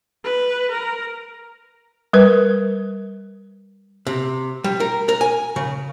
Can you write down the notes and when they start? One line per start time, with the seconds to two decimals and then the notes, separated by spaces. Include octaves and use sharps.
0.24 B4
0.72 A#4
2.13 G3 A#4 B4
4.07 C3
4.64 G3
4.80 A#4
5.09 A#4
5.21 G#5
5.56 C#3